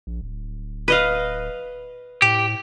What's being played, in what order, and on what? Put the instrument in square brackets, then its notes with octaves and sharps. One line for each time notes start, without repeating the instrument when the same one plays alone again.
[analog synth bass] A#1
D1
[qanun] B4 D#5 F5
[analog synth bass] A2 [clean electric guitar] G4